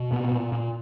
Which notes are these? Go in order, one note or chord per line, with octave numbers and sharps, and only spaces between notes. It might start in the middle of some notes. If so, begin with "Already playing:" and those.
Already playing: B2
A#2 B3
A#2
A#2